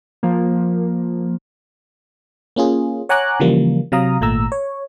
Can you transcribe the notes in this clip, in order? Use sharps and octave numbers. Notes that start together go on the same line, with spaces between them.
F3 A#3
A#3 C#4 F4 G#4
C#5 F#5 G#5 A#5 D6 F#6
C#3 E3 F3 G3 A#3
C3 F#3 F5 A#5 D#6
G#1 A#2 A3 A#5 E6
C#5